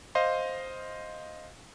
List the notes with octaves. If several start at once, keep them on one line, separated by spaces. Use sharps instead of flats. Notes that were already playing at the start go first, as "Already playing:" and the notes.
C5 D#5 F5 C6